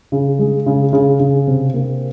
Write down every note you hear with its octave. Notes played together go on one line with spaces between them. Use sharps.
C#3
G#3
C#3
C#3
C#3
C3
A#3